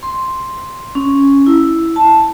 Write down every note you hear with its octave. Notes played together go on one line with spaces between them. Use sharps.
C6
C#4
E4
A5